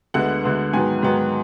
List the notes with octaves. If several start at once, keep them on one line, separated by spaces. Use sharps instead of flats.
D2 D3 G#3 B3 F#5
D2 D3 G#3 B3
G#2 D#3 F#3 B3 G#5
G#2 D#3 F#3 B3